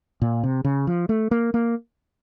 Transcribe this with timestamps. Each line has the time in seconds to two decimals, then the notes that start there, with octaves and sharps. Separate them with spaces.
0.22 A#2
0.43 C3
0.65 C#3
0.87 F3
1.09 A3
1.31 A#3
1.54 A#3